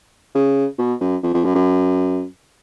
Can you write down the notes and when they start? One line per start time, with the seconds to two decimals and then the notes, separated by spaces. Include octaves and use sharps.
0.35 C#3
0.78 B2
1.01 F#2
1.23 F2
1.34 F2
1.45 F#2
1.55 F#2